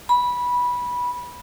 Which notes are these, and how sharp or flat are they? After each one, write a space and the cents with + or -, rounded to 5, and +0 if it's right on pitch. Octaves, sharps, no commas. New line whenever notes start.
B5 -15